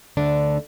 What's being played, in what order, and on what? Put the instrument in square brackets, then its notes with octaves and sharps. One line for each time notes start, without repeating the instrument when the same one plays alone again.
[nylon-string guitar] D2 D3 D4